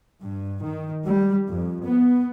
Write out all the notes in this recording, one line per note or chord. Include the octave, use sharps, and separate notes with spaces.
G2
D#3
G3
F2
B3